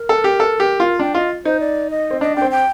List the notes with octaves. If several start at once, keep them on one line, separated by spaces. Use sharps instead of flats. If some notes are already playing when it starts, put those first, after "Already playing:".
Already playing: A#4
A4
G4
A4
G4
F4
D4 G5
F4 D#5
D#4 C5
D5
D#5
C4
D4 D#5
D4 G5
C4
G5